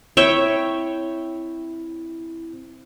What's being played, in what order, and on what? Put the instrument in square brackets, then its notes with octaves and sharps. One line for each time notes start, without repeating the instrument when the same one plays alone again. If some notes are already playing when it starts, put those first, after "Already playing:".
[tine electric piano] C4 E4 [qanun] C#5 E5 G5